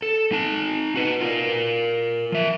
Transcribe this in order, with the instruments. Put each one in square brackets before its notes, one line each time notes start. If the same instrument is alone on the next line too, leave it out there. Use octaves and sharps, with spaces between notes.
[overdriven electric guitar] A4
D#4 A5
F#4 B4
F4 A#4
F3 E5